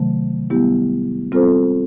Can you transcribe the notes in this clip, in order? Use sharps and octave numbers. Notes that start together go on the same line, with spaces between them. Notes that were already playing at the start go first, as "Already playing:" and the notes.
Already playing: C3 D#3 F#3 A3
G3 B3 E4 G4
G3 C4 F4 A4 C5